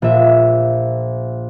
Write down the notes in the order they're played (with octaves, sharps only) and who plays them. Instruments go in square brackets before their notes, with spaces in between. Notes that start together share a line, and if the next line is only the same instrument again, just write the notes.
[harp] A#1 E5